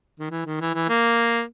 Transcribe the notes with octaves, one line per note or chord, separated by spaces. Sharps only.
D#3
E3
D#3
E3
E3
A#3